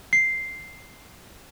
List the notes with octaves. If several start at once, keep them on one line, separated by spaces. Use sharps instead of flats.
C7